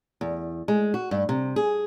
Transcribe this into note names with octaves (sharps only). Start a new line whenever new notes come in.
E2
G#3
F#4
G2
C3
G#4